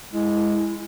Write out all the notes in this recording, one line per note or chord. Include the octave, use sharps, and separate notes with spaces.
G#3 E4